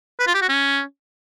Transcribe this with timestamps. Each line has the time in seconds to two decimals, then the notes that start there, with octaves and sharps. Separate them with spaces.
0.19 B4
0.27 F4
0.34 G4
0.42 F#4
0.49 C#4